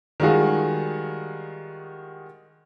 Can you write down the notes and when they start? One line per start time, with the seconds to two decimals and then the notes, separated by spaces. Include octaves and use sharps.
0.20 D#3 G3 G#3 F4 F#4 G#4